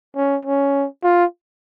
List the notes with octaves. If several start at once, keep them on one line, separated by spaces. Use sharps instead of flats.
C#4
C#4
F4